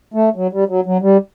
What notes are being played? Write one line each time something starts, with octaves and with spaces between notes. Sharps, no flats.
A3
F#3
G3
F#3
F#3
G3